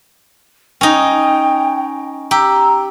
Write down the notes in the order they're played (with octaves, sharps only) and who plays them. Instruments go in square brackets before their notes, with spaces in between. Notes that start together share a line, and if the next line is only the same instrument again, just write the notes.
[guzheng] C#4 D#4 [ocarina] G5 [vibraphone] G#5
[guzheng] G4 [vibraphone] A#5 [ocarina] E6